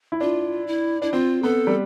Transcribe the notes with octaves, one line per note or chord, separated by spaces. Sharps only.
E4
D4 F4
E4
D4 E4
C4 F4
B3 A4
G3